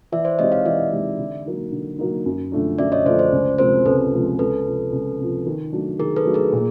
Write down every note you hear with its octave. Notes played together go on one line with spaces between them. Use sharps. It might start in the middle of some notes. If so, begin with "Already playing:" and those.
E3 D5 E5
C5 D5
G#3 C4 D#4 G4 C#5 D#5
D#5 F5
E3 D5 E5
G#3 C4 D#4 G4
D3
F#3 A#3 D#4
D3
F#3 A#3 D#4
F#2
D3 F3 A3 D4
F#2 D5 E5
C#5 D#5
D3 F3 A3 D4 C5 D5
C5 D5
C#2
C3 F3 G#3 C4 A#4 C5
C#2 A4 B4
C3 F3 G#3 C4
C#2 A4 B4
C3 F3
C#2
C3 F3
D#3
F#3 A3 D4
D#3 G#4 A#4
A4 B4
F#3 A3 D4
G#4 A#4
A#2